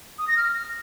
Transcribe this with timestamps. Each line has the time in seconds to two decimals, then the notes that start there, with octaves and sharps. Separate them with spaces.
0.18 D#6
0.28 A#6
0.37 F6